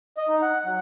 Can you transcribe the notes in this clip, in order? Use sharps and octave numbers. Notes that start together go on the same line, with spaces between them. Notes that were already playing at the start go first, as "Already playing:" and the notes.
D#5
D#4
F#5
F#3 F#5